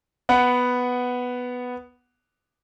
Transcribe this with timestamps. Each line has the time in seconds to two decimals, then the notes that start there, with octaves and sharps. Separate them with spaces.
0.29 B3 F#5